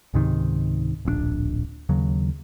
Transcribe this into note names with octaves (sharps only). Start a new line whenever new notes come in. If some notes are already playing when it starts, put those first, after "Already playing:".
C#2 G#2 C3 D#3
D1 A#1 C4 D4
D#2 C#3 F#3